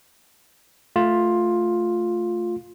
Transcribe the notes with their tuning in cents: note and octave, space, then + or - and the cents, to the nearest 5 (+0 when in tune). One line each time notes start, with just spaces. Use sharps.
A3 +0 F4 +10